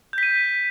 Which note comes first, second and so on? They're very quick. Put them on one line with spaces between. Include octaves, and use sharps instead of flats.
G6 B6 D#7